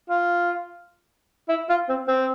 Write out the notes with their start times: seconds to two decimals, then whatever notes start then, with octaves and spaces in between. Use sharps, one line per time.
0.09 F4
1.49 E4
1.69 F4
1.89 C4
2.08 C4